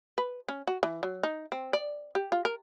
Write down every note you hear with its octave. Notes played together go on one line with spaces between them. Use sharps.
B4
C#4
F#4
E3
F#3
D#4
C4
D5
G4
F4
A#4